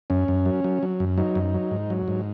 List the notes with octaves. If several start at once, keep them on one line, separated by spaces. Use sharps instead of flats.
F#2 C#4
F#2
F#3
F#3
F#3
F#2
F#3 D#4
F#2
F#3
G#2
F#3
G#2